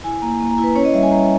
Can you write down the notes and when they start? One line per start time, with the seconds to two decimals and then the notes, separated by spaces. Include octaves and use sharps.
0.04 E4 G#5
0.22 A#3 A#5
0.40 A#3
0.51 A#5
0.58 E4
0.63 B4
0.75 C#4 C#5
0.85 D#5
0.93 G3 E5
1.03 G#5
1.11 G3 A#5